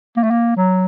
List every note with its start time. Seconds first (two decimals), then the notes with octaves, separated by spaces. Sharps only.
0.17 A#3
0.24 A3
0.31 A#3
0.57 F#3